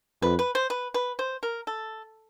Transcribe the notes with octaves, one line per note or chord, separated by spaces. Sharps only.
F2 B4
B4
C5
B4
B4
C5
A#4
A4